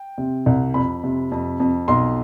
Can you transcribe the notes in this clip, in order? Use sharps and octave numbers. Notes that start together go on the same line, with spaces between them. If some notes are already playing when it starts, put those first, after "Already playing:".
Already playing: G5
C3
C2
F2 B5
C3
F2
F2
B1 C6